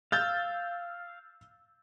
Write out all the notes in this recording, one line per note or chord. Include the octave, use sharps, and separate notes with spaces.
F5 E6 G6 A6